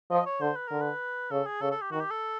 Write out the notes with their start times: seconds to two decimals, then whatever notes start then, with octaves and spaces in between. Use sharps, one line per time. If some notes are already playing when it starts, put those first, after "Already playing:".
0.11 F3 D#5
0.26 C#5
0.40 D3 C5
0.56 B4
0.68 D3 A#4
0.82 B4
1.31 C#3 A4
1.46 G#4
1.61 C#3 A4
1.72 A4
1.82 G4
1.91 D#3 F#4
2.01 G4
2.11 A4